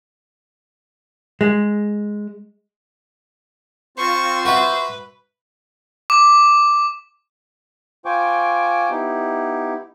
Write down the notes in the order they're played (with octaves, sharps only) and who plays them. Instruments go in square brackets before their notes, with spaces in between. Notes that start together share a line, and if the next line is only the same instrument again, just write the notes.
[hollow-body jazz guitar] G#3
[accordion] C4 F4 [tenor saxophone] C5 [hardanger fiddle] C#6
[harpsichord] F#4 E5 [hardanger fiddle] B4
[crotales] D6
[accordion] F4 C5 G5 G#5 C#6 D6
B3 D#4 E4 G4